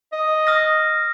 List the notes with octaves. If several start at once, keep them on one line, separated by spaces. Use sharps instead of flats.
D#5
D#6 F6 A#6